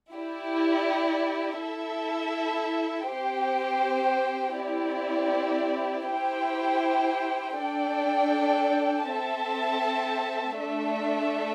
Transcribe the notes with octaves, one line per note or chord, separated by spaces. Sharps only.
E4 G4 D5
E4 A4 E5
C4 G4 C5 G5
C4 E4 G4 D5
E4 G4 C5 G5
D4 A4 D5 G5
C4 A4 E5 A5
A3 D4 A4 E5